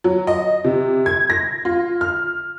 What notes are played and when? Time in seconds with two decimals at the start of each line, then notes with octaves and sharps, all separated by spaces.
0.04 F#3
0.27 D#5
0.64 C3
1.06 G#6
1.30 A#6
1.65 F4
2.01 F6